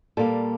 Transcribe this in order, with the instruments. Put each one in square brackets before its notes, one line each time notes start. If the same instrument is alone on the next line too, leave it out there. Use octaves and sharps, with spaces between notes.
[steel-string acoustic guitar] A#2 G3 A#3 A4